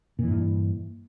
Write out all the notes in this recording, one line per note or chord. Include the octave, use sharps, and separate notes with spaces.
G2 A#2 E3